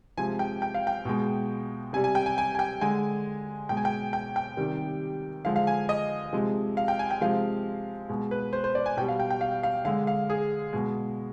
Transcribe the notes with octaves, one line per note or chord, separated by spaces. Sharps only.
C3 F3 G#3 G#5
G5
G5
F5
G5
B2 G#3
C3 G3 G#5
G#5
G5
G#5
G#5
G#5
G5
D3 G#3 G#5
B2 G#3 G5
G#5
G5
G5
G5
C3 D#3 G3
D3 F3 G#3 F5
F5
G#5
D#5
C3 F3 G#3
F5
G5
G#5
G5
C3 F3 G#3 F5
B2 G#3
B4
C5
C5
D5
G#5
B2 G3 G5
F5
G5
G5
F5
F5
D3 G#3 F5
F5
G#4
B2 G#3